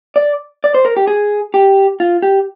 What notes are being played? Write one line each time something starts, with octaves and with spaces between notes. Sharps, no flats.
D5
D5
C5
A#4
G4
G#4
G4
F4
G4